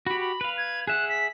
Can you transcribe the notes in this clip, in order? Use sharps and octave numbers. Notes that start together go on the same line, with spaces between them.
F#4 G4 B5
B5
B4 F5
G#6
G#4 E5 F#5 F#6
B6